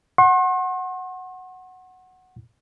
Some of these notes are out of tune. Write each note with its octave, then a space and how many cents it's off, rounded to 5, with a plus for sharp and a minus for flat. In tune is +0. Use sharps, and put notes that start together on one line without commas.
F#5 +0 C6 +45